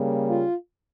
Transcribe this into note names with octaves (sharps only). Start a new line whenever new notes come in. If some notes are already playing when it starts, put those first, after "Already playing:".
Already playing: C#3 G3 A#3
F4